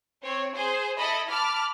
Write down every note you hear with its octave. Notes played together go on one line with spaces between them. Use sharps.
C4 C#5
G#4 C5
E4 A4 D#5 B5
A5 B5 D6 F6